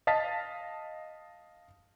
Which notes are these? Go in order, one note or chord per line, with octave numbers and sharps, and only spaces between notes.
D#5 F5 A5 A6 B6